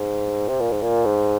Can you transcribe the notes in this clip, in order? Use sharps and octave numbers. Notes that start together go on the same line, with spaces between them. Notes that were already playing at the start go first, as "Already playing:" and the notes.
Already playing: G#2
C3
A#2
G#2
A#2
G#2